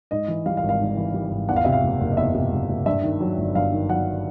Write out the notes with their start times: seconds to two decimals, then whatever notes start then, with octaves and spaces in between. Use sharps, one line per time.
0.11 G#2 D#5
0.28 E3
0.46 G3 F5
0.57 F5
0.63 G#1
0.69 F5
0.80 G#2
0.97 E3
1.14 G3
1.31 G#1
1.49 E2 F#5
1.56 F5
1.65 C3 E5
1.72 F5
1.83 F#1
2.01 F#1
2.12 D#5
2.17 E2 E5
2.35 C3
2.52 F#1
2.69 F#1
2.86 G2 E5
3.03 D#3
3.21 F#3
3.38 G1
3.55 G2 F5
3.72 D#3
3.89 F#3 F#5